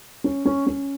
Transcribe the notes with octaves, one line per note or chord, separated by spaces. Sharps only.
C#4
C#4
C#4